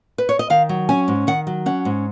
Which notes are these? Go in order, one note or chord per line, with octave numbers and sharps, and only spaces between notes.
B4
C#5
D#5
D#3 F5
F#3
C#4 G#5
G#2
D#3 F#5
F#3
C#4 F#5
G#2